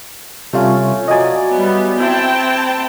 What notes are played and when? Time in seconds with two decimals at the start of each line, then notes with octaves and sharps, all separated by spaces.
0.53 C3 G3 A3 C#4 F4
1.08 F3 F#3 D5 D#5 G#5
1.51 G3 B3
2.00 C4 E4 G5 A5